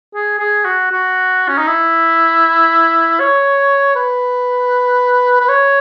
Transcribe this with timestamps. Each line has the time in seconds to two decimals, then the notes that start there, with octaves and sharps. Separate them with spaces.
0.14 G#4
0.39 G#4
0.65 F#4
0.91 F#4
1.48 C#4
1.58 D#4
1.67 E4
3.20 C#5
3.95 B4
5.40 B4
5.49 C#5